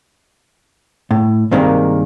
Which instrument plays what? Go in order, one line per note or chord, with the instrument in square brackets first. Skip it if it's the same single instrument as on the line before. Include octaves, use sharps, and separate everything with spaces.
[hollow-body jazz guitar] A2
G2 C3 D#3 G#3 A#3